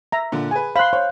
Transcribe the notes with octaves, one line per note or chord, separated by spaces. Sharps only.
E5 A#5
A#2 D3
G#4 B4 G#5
C5 F5 B5 C6 F#6
C5 C#5